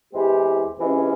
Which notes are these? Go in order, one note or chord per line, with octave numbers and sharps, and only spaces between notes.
E2 E3 G#3 C4 G4
C#2 C3 E3 G#3 C#4